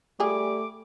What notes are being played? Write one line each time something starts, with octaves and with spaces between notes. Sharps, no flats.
G3 A3 F4 G#4 D6